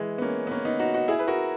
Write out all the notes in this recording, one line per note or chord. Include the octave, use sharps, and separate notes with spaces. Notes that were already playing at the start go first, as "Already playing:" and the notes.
Already playing: E3 G#3
B3
A#3 C#4
B3
A#3 C#4
B3 D#4
D#4 F#4
D#4 F#4
E4 G#4
B4
F#4 A#4